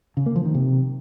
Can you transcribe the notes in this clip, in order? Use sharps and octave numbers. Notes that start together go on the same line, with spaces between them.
C#3
A#3
F3
D#3
C3